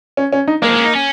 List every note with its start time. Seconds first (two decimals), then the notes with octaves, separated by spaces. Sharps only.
0.17 C#4
0.32 C#4
0.48 D#4
0.62 G#3 A#3
0.69 F3
0.74 G#3
0.79 C#4
0.85 D#4
0.96 C#4